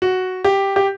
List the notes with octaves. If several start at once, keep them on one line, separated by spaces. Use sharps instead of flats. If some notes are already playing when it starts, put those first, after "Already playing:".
F#4
G4
G4